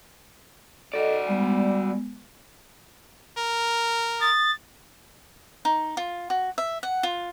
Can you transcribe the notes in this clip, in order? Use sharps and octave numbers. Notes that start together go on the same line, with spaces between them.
F#4 A4 D5 D#5
G3 G#3 B3
A#4
D#6 A6
D#4
F4
F#4
E5
F#5
F4